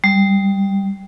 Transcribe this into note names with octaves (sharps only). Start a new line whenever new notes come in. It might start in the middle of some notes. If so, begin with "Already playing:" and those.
G3